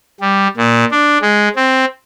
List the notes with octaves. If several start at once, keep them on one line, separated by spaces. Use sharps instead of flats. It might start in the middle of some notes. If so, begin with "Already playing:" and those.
G3
A#2
D4
G#3
C4